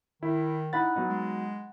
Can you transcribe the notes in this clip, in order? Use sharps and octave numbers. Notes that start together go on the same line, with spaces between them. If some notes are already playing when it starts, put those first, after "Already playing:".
D#3 E4
D#4 E4 F#5 B5 A6
F#3 B3 D#4
G#3